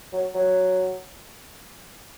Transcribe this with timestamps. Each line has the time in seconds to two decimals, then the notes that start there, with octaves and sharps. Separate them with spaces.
0.13 F#3
0.34 F#3